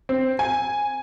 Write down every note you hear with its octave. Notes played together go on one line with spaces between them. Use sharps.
C4
G#5